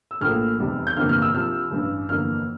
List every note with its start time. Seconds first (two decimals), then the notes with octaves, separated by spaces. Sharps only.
0.11 E6
0.21 A#1 A2 F3 A#3 F6
0.59 F1 E2 C3 G3
0.87 G6
0.96 G1 F2 C3 E3 A#3 F6
1.09 F6
1.22 E6
1.33 C2 C3 F3 F6
1.71 A1 G2 E3
2.09 G1 F2 E3 A#3 F6